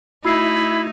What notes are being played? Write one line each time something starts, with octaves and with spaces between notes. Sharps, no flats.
A3 D#4 E4 F#4 B5 E6 C7